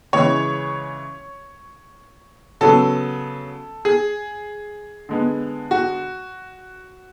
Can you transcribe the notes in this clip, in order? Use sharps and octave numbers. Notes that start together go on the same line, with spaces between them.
C#3 E3 G#3 C#5
C#3 F#3 B3 A4
G#4
D3 G#3 B3
F#4